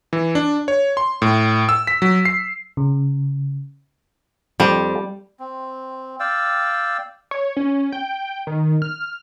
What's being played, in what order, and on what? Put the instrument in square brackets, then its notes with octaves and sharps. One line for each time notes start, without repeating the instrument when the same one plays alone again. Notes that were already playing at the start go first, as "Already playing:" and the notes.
[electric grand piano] E3
D4
C#5
C6
A2
E6
B6
F#3
C7
[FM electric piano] C#3
[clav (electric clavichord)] F2 [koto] G3
[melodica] C4
D5 F5 G5 E6
[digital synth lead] C#5
C#4
G5
D#3
F6